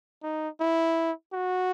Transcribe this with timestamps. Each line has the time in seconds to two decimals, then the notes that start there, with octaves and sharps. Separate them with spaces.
0.23 D#4
0.60 E4
1.33 F#4